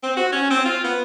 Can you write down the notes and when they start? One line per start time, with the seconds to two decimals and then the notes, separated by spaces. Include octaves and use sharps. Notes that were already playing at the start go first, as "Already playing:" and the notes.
0.04 C4
0.16 F#4
0.33 C#4
0.51 C4
0.66 F4
0.84 B3